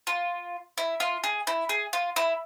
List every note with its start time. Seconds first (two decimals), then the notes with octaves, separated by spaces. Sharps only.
0.07 F4
0.78 E4
1.00 F4
1.24 G#4
1.47 E4
1.69 G#4
1.93 F4
2.16 E4